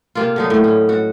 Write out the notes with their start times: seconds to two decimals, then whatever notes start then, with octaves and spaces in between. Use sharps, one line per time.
0.15 C3 A#3 F4
0.36 D3 F#3 D#4
0.50 A2
0.64 C#4
0.89 F#4